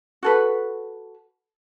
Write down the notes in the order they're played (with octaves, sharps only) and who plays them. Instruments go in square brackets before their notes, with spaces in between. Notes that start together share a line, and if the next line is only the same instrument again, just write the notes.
[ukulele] F#4 A4 B4